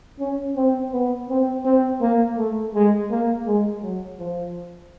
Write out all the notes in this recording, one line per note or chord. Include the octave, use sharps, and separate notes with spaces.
C#4
C4
B3
C4
C4
A#3
A3
G#3
A#3
G#3
F#3
F3